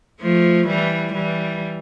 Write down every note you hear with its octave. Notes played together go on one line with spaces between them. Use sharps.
F3 A3
E3 G3
E3 G3